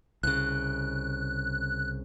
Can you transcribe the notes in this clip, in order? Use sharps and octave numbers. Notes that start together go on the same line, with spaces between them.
C2 C#3 F#6